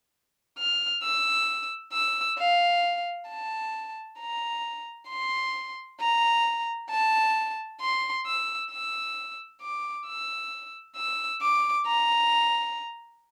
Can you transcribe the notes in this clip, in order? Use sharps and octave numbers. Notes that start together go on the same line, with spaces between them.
F6
E6
E6
F5
A5
A#5
C6
A#5
A5
C6
E6
E6
D6
E6
E6
D6
A#5